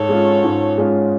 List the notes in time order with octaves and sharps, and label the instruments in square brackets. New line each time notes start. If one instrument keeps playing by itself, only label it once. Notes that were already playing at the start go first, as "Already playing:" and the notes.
Already playing: [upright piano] G#2 [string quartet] A4 C#5
[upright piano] G#3 C#4 F4
G#2
G#3 C#4 F4